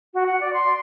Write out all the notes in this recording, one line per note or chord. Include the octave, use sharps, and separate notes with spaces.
F#4
F#5
D5
C6